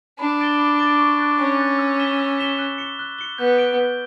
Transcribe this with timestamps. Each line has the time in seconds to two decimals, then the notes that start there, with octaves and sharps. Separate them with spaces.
0.19 D4 B5
0.40 D6 A6 D7 G7
0.59 B5
0.79 D6 A6 D7 G7
0.99 C#6
1.19 F#6 A6
1.39 C#4 C#6
1.59 F#6 A6
1.79 E6
1.99 B6 E7 G7
2.18 E6
2.39 B6 E7 G7
2.59 F#6
2.78 C#7 G7
2.99 F#6
3.18 C#7 G7
3.38 B3 G6
3.58 D7 G7
3.79 G6